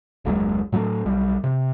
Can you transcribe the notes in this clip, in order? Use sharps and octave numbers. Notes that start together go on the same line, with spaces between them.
F#1 D#2 F#3 G#3
A2 F#3 G3 A3
B1 G3
C3